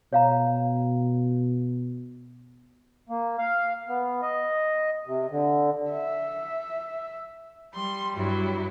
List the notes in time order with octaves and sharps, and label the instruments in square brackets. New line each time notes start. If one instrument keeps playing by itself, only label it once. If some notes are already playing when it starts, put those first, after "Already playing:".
[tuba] B2 [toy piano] C#5 F5 A#5
[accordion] A#3
F5
B3
D#5
C3
D3
[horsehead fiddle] E5
[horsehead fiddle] G3 [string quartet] C6
[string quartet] G2 F#3 E4